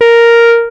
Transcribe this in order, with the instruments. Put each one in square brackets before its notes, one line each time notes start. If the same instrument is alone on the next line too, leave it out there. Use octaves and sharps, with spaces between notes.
[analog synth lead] A#4